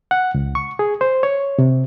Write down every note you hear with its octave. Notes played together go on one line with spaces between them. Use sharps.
F#5
C#2
C#6
G#4
C5
C#5
C3